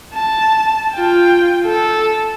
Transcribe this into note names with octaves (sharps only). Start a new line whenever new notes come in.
A5
F4 G5
A4